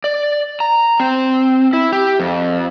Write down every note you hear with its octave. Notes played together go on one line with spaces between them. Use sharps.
D5
A#5
C4
E4
G4
F2